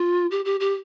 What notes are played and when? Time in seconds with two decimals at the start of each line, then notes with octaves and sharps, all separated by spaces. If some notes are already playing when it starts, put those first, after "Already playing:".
Already playing: F4
0.31 G4
0.45 G4
0.60 G4